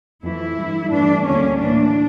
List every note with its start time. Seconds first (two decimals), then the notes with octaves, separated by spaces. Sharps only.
0.23 F2 E3 A3 E4
0.57 G2 E3 G3
0.91 G2 E3 A3 D4
1.25 D2 D3 G3 A#3 C#4
1.60 A2 E3 A#3 D4